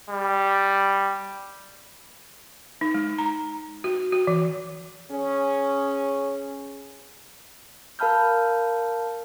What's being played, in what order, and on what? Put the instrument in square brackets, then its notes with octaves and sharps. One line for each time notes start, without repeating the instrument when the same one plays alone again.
[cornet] G3
[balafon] D#4
G#3
A#5
F#4
F#4
E3
[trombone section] C#4 G#4
[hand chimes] A#4 F5 A5 B5 F6 G6